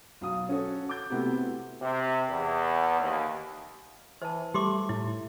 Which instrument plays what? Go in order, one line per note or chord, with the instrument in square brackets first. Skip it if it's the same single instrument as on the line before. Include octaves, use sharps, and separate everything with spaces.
[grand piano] B1 B2 F5 D#6
C#4 F#4 A4 C#5
D6 G6
C3 A3 B3 C4 E4 F#4
[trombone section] C3
E2
D#2
[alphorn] E3 [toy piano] C5 A5
[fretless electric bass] G3 [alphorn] A3 [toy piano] G4 C6 D6
[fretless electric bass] A2 [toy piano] E4